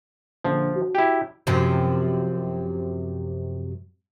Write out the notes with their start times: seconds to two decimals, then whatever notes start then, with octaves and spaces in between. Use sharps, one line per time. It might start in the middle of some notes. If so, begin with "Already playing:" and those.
0.44 A#1 D3 F3
0.75 F#3
0.95 E4 G4
1.47 F#2 C3 F3